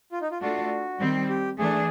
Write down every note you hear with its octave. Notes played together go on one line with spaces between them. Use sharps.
F4
D#4
F4
A3 D4 F4 F#4 A4
D#3 G3 C4
G4
E3 A3 D4 G#4